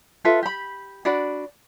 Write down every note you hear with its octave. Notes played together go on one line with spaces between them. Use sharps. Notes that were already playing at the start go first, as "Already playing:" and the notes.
F4 A4 B4 E5
G4 B5
D4 F#4 D5 B5